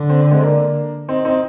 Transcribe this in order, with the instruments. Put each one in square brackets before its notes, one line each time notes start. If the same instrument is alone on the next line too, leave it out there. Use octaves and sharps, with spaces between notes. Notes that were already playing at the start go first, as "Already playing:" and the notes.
Already playing: [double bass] D3
[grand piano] C4
D4
G#3 C4
A#3 D4
C4 D#4
C4 D#4